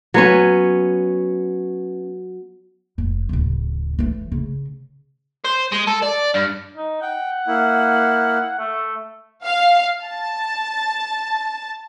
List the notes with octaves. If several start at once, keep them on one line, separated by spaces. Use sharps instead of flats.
F#3 B3 C#4
F1
D1 C#3
E3 A3
C#3
C5
G#3
A4
D5
G2
D#4
F#5 G5
A#3 E4
A3
F5
A5